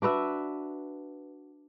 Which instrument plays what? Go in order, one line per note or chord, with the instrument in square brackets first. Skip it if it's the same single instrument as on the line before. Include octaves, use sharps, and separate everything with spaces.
[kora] D4 F#4 B4 E5